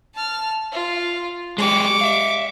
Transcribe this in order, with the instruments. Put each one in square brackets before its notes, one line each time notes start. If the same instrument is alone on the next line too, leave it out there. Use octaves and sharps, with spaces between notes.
[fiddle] A5 F6
F4
[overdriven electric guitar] G#3 G4 [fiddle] C#6 D6
[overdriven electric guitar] E5 F5